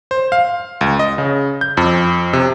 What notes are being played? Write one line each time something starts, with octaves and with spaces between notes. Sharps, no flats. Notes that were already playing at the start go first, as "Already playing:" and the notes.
C5
F5
C#2
D#5
C#3
G6
F2
C3